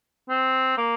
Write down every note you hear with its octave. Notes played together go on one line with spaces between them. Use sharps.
C4
A#3